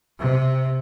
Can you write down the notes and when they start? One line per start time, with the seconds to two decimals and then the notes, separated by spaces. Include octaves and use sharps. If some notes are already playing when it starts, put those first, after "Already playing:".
0.19 C3